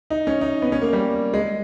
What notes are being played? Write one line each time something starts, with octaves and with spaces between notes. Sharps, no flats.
D#4
C#4
D#4
B3
C#4
A#3
G3
G#3